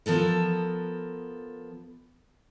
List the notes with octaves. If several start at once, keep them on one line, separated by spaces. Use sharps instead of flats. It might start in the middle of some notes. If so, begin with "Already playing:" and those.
F3 B3 A4 A#4